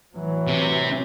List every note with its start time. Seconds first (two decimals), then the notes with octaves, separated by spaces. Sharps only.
0.15 A2 E3 F#3
0.47 C3